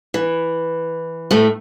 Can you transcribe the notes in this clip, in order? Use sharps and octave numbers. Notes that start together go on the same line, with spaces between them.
E3
A2 A3